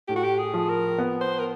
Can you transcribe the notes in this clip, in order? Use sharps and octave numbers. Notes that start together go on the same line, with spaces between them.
A2 G4
F#4
G4
G#4
F3
A#4
B3
C5
A#4